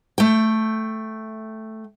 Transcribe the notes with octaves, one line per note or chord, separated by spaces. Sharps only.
A3 G5